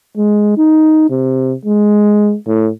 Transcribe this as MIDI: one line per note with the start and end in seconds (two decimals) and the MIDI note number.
0.17 0.54 56
0.58 1.09 63
1.10 1.53 48
1.65 2.35 56
2.47 2.69 45